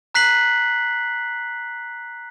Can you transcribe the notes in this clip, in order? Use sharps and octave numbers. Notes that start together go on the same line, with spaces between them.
A#5 F#6 B6 C7 F#7